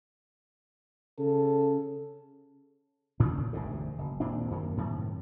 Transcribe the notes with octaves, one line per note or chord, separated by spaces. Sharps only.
C#3 A4
D2 A#2 C#3 D4
E1 D2 G#2 C3
F#1
D#1 A#2 C4 D4
F#2 D#3 A#3
F#2 A2 C3 D#3